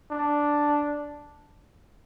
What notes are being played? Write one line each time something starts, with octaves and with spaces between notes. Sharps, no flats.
D4